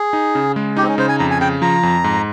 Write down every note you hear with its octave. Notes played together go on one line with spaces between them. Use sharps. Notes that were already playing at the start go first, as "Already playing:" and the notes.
Already playing: G#4
D#4
C#3
G#3
D#4 G4
C4
C#4
C#3 C5
G#5
F2 A#5
G#5
C#3 G5
F3 A#5
F2
G#2